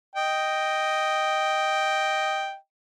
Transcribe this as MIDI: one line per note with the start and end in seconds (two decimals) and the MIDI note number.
0.16 2.56 75
0.16 2.56 79